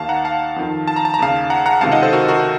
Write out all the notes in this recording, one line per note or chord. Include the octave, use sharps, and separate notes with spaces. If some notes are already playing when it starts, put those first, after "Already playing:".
Already playing: D#2 D#3 F5 A5
F#5 A#5
F5 A5
F2 D#3
A5
A#5
A5
A#5
D#2 C#3 F5 A5
F#5 A#5
F#5 A#5
C#2 C3 D#3 F5 A5
D#5 F#5
A4 C5
F#4 A#4
F#4 A#4